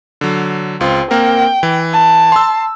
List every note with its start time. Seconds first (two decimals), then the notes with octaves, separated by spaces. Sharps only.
0.21 D3 F#3
0.81 C#2 C4 F4
1.11 A#3 C4 A#4 G5
1.63 E3
1.93 A5
2.32 C6 E6